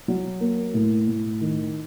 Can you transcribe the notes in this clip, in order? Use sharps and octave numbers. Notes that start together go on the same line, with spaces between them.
F#3
A#3
A2
A2
D#3